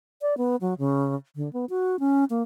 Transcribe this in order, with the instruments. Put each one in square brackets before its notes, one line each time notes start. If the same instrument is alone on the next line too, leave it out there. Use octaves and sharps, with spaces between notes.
[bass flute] D5
B3
F#3
C#3
D3
B3
F#4
C#4
A#3